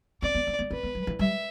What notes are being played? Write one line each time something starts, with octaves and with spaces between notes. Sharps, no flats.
C4 D5
B3
C4
B3
C4 B4
B3
F#3
E3
G3 E5